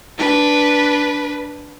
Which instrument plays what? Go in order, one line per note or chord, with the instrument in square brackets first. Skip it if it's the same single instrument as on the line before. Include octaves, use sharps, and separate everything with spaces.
[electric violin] D4 B4